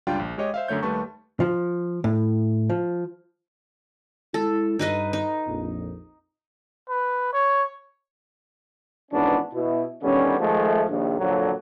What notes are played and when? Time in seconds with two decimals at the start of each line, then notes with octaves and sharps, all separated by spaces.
0.07 G1 C#2 G3 D4 F4 G5
0.19 A#1
0.38 G#3 G4 C#5 D#5
0.54 C5 E5 F5
0.68 F#2 D3 A3 C#5 G6
0.83 D#2 G3 A3 B4 A5 C#6
1.40 F3
2.04 A2
2.70 F3
4.34 G#3 E4 A4
4.79 G2 D#4 B4 D#5
5.13 D#4
5.47 A#1 F2
6.89 B4
7.33 C#5
9.11 G#1 G#2 E3 B3 C#4 D4
9.52 B2 E4
10.02 D3 D#3 G3 B3 C#4
10.38 D#3 F3 G#3 A3
10.88 A#1 D#2
11.18 F2 A#2 D3 F3 F#3